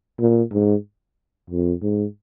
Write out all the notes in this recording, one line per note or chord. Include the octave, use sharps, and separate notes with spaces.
A#2
G#2
F2
G#2